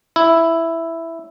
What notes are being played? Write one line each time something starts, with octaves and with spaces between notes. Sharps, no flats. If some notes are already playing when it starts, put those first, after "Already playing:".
E4